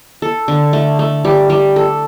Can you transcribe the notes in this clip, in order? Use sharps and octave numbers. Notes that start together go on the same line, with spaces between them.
A4
D3
A3
A3
G3
G3
A4